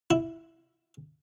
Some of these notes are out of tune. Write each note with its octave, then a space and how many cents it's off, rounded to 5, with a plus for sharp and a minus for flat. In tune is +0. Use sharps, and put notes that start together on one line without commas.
E4 +5